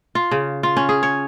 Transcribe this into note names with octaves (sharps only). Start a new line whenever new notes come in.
F4
C#3
F4
C#4
G#4
C#5